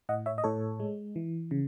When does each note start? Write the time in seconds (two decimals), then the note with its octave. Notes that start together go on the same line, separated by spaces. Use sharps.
0.09 A2 D#5 F#5
0.26 C#5 E5
0.38 D#5
0.44 A2 A4 C#5
0.80 G#3
1.16 E3
1.51 C#3